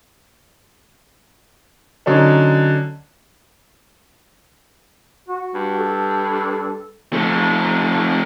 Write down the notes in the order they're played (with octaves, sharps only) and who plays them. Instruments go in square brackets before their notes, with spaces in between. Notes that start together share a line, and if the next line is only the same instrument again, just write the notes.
[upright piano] D3 F#3 C#4 D#4
[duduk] F#4
[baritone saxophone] G2
[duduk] A4
[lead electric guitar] F3 A3